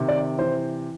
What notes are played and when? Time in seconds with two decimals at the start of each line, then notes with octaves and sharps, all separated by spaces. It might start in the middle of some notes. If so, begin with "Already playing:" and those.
Already playing: C3 D#3
0.08 D5
0.38 E3 C5